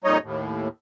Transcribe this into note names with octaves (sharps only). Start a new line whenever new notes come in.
F2 A#2 G3 D#4 C#5 D#5
D#2 A2